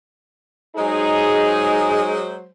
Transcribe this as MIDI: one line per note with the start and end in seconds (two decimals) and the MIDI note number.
0.77 2.48 54
0.77 2.48 56
0.77 2.19 63
0.77 2.19 68
0.77 2.48 72